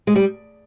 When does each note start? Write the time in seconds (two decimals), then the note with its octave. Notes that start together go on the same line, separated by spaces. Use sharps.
0.07 G#3
0.16 G3